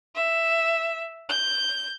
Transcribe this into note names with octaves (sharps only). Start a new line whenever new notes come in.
E5
G6